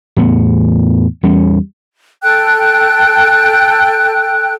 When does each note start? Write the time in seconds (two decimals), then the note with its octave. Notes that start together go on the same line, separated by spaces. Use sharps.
0.17 E2 A2 B3
1.23 E2 G3 C#4
2.23 A4 G5 F#6